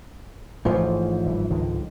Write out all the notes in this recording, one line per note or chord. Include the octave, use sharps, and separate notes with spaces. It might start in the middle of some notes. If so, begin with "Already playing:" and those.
A1 G#2 E3 F3 A3
G1 E3
C#2 D3 D#3